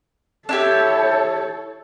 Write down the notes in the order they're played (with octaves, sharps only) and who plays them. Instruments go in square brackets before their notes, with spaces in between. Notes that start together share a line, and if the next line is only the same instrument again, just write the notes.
[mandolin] D4 E4 G4 [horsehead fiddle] A4 C#5